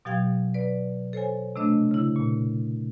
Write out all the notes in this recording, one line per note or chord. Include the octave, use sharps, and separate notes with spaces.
B2 F#3 G4 F5 G5 G#6
B4 D5
A4 C5 C#5 G#5
C3 A3 D4 D#5
C#3 E4
A#2